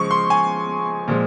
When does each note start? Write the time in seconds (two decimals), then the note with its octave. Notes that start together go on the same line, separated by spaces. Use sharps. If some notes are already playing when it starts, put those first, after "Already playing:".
Already playing: C#3 F3 G#3 C#6
0.11 C6
0.30 G#5
1.08 A#2 F3 G#3